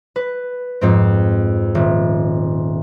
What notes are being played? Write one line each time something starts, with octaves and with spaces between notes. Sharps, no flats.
B4
F2 G#2 C4
D#1